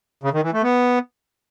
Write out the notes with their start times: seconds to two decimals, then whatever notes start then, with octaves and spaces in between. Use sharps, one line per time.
0.23 C#3
0.33 D#3
0.43 E3
0.53 A3
0.63 B3